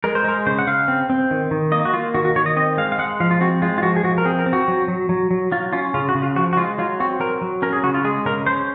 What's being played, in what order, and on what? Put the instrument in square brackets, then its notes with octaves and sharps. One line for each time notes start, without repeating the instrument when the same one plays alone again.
[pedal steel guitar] G#3 A#4
C5
G#3 A#4
C#3 C5
F#5
C#3 F5
C4
C4
D#3
D#3
A#3 D#5
F#4
A#3 F4
D#3 F#4
F#4
D#3 C#5
D#5
C4 D#5
G#3 F5
F5
G#3 F#5
F3 F5
F4
C4 F#4
G#3 F4
F4
F3 F#4
G#4
F3 F#4
A#4
C4 G#4
A#4
C4
F#4
F#3
F#3
F#3
F#3
F#3 F4
C#4 F4
C#3 F4
F#4
C#3
F4
F3 F#4
F#4
G#3 F4
F#3 F4
C4 F#4
F#3 A#4
F#3
C#4 A#4
G#4
C#3 F#4
F4
G#3 G#4
C#3 A#4
C#4 C5